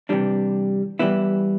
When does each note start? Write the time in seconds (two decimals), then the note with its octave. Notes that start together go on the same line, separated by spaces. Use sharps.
0.09 C3 E3 G3 D4
0.99 E3 G3 B3 E4